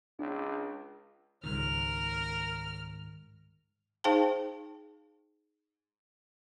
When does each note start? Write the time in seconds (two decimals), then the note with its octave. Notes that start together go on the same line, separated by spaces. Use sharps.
0.19 C#2 D4
1.43 C#2 G#2 D#3 G3 A#4 F6
4.04 D#4 G#4 C5 F5 G5 A5